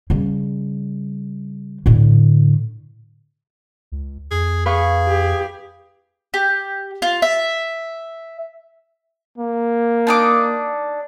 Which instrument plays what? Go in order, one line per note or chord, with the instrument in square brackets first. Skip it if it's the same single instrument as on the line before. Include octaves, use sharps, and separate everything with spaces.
[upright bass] C#3 G3
A2 D3
[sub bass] C#2
[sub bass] F2 [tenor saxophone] G#4
[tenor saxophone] G#4 [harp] B4 F5 C#6
[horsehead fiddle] G4
[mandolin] G4
F4
E5
[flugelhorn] A#3
[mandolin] D4 D#4 D6